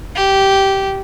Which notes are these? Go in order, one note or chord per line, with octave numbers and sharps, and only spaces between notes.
G4